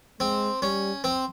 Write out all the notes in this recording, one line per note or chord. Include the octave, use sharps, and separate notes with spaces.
G#3 C4
G3 C#4
C4